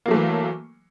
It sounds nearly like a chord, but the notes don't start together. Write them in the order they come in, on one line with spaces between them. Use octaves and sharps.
A#3 F#3 A3 E3